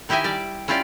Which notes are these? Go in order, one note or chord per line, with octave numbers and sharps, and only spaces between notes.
D#3 E4 G4 D#5 E5 G#5
G3 D5
C#4 E4 F4 G4 D5